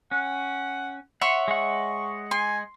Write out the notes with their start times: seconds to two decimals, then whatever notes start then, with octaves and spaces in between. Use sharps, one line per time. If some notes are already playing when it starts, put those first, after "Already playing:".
0.11 C#4 F#5
1.21 C#5 E5 F#5 C6
1.48 G#3 F#5 C#6
2.31 G#5 C6